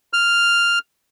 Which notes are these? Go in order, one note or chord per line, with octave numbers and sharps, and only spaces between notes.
F6